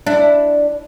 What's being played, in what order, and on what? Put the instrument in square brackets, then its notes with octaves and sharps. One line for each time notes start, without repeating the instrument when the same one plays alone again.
[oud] D4 E4